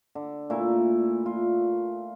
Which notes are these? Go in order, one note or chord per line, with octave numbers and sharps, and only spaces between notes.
D3
A#2 A3 E4
F4